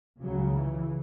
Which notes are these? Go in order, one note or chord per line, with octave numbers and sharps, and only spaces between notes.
C#2 C#3 F#3
E3